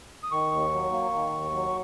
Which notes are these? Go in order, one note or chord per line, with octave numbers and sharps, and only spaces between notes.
D#6
D#3 C#6
D#2
F#3
A#3
D#3
D#2
F#3